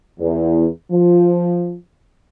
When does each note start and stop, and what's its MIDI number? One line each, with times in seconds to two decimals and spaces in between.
0.20 0.67 40
0.92 1.75 53